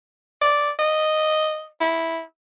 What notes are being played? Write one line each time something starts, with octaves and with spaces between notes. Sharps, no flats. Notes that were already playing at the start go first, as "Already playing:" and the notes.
D5
D#5
E4